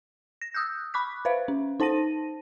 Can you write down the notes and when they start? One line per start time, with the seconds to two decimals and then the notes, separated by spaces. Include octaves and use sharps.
0.42 A#6
0.54 D#6 E6 F#6 G6
0.94 B5 C#6 D6 F#6 B6
1.25 B4 C5 E5 F5
1.48 C#4
1.80 D#4 C5 A5 A#6 D#7